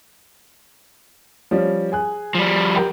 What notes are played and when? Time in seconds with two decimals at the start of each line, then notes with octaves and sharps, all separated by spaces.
1.51 F3 G3 C#4
1.92 G#4 G#5 F#6
2.35 F3 G3
2.76 G4 A#4 G5